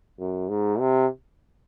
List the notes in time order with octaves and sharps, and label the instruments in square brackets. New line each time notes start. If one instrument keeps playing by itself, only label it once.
[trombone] F#2
G#2
C3